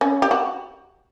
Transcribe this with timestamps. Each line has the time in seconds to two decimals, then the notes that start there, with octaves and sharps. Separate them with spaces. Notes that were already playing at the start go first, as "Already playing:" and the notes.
0.01 C#4
0.22 G4
0.31 F#4